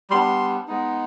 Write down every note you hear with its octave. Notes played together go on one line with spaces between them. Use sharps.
G3 B3 D4 C6
G#3 B3 D#4